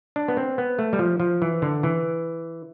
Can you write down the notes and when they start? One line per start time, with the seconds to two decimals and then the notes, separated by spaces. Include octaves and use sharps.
0.16 D4
0.28 B3
0.37 C4
0.58 B3
0.79 A3
0.93 G3
0.99 F3
1.20 F3
1.42 E3
1.62 D3
1.83 E3